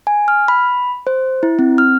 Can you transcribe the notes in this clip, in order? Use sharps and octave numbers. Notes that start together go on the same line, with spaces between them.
G#5
F6
B5
C5
E4
C4
F6